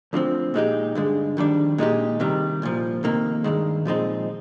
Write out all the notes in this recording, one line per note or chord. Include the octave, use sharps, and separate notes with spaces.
D2 D3 F3 C4
A#2 G#3 D#4 G4
G2 D3 G#3
F2 D#3 G3 D4
A#2 G#3 D#4 G4
C3 D#3 G3
C2 A#2 F3
F2 C3 D#3 A#3
G2 D#3 G#3
A#2 F3 G#3 C4 D#4